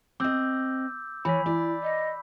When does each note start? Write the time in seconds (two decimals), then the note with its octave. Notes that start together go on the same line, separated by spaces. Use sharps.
0.20 C4 D#5 D6 E6 G6
1.25 E3 C#5 B5 B6
1.46 E4 D5
1.83 D#5